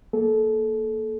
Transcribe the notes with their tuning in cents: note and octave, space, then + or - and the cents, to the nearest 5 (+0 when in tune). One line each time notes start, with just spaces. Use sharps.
A#3 +0 A4 -25